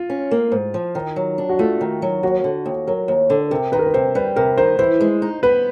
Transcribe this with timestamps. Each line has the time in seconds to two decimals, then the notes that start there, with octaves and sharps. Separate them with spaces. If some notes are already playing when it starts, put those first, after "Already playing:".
Already playing: F4
0.10 C#4
0.31 A#3
0.52 G#2
0.74 F3
0.95 D#3
1.16 F#3
1.38 D4
1.49 F#4
1.59 A3 F4
1.81 D#3
2.02 F#3
2.23 D#2 F#4
2.44 D3
2.66 D#2
2.87 F#3 A#4
3.08 D#2
3.30 D3
3.51 C3 A#4
3.72 D#3 B4
3.79 A#4
3.86 B4
3.94 C3 C5
4.15 G3 B4
4.36 C3 A#4
4.58 D#3 C5
4.79 E3 C5
5.01 G#3
5.22 D#4
5.43 B3 B4